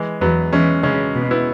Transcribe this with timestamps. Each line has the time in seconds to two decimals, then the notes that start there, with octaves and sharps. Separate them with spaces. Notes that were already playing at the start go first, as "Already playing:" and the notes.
Already playing: E3 G#3
0.21 E2 F#3 B3
0.53 E3 G#3 C#4
0.83 C#3 G#3 C#4
1.15 B2
1.31 B3 E4